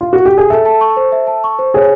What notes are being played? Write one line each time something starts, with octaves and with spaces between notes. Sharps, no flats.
F4
F#4
G4
G#4
A4 E5
A5
C#6
C5
E5
A5
C#6
C5
G#4 C#5